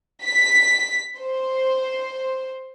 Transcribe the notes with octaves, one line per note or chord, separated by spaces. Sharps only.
B6
C5